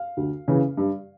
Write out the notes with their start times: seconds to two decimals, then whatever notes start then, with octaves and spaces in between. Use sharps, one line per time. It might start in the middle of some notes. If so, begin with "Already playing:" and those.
Already playing: F5
0.17 D2
0.48 C#3 E3
0.77 G2